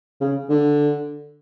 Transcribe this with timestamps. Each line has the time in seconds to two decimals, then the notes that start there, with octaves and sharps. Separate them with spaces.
0.21 C#3
0.49 D3